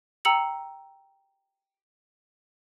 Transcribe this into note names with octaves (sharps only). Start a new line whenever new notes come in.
G5 A#5 E6 C#7 F#7